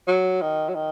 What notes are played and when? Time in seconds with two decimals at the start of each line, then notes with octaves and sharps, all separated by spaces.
0.08 F#3
0.41 D#3
0.69 F#3
0.75 D#3